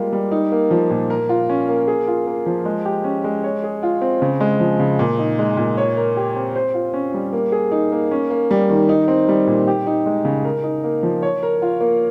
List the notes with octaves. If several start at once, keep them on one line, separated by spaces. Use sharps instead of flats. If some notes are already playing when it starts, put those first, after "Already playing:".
Already playing: G3 G#3 A#3 F4
G3
D#4
A#3
F3
A#2
A#4
F4
C#4
A#3
G#4
F4
A#3
F3
G#3
G4
C#4
G#3
C#5
G#4
F4
C4
C#3
G#3
F3
C#3
A#2
D#4
G#3
A#2
C#5
A#4
G4
C4
C5
F4
C#4
G3
A#3
G#4
D#4
A#3
C#4
A#3
G3
D#3
D#4
C4
G3
A#2
G4
D#4
G#3
C#3
A#4
D#4
A#3
F3
C#5
A#4
F4
A#3